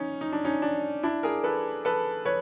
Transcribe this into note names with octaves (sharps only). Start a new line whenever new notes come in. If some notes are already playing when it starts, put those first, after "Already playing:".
Already playing: C#4 D#4
D#4
D4
C#4 D#4
D4
D4 E4
G#4 A#4
A4 B4
A4 B4
B4 C#5